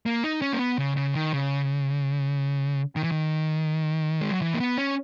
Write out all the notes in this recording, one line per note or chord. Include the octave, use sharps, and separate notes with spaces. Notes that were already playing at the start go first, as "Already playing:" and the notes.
A#3
D#4
C#4
A#3
B3
C#3
C#3
D#3
C#3
D#3
E3
D#3
G#3
F#3
E3
A#3
B3
C#4